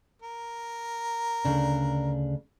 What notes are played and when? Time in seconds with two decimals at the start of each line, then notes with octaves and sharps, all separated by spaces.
0.22 A#4
1.45 D2 C#3 D4